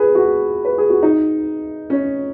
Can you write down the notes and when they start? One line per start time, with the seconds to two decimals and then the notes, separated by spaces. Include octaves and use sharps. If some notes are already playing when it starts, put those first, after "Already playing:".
Already playing: G#4 B4
0.15 F#4
0.65 B4
0.78 G#4
0.90 F#4
1.03 D#4
1.90 C#4